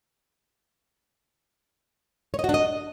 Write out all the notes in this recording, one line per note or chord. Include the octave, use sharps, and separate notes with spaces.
C#5
D#5
F#4
D4
D#5